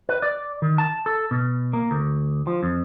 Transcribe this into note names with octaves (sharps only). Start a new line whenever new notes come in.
B4
D5
D#3
A5
A4
B2
A#3
D2
F3
F2